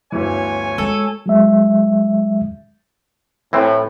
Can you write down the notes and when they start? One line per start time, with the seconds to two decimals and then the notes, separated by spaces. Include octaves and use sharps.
0.12 G1 D2 E3 C#5 G#5
0.78 G#3 A4
1.26 F#3 G#3 E5
3.53 A2 E3 C4